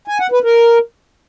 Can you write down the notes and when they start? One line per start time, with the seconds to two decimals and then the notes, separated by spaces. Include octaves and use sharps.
0.08 G#5
0.20 F#5
0.32 B4
0.44 A#4